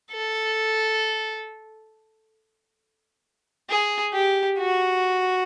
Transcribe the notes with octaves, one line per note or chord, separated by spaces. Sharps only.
A4
G#4
G4
F#4